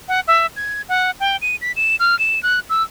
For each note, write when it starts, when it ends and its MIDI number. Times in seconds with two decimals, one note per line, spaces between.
0.08 0.20 78
0.28 0.47 76
0.56 0.82 92
0.89 1.11 78
1.20 1.37 79
1.42 1.56 99
1.62 1.72 95
1.76 1.96 100
2.00 2.18 89
2.19 2.42 100
2.43 2.60 90
2.70 2.83 88